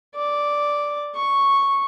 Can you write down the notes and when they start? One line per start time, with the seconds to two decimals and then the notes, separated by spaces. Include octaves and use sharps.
0.15 D5
1.15 C#6